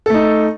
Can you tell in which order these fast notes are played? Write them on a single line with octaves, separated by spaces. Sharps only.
A4 A3 D#4